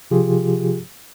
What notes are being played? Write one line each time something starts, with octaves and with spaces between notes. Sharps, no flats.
C3 F3 F4 G4 G#4